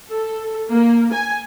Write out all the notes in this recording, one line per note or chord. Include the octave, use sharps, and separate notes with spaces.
A4
A#3
G#5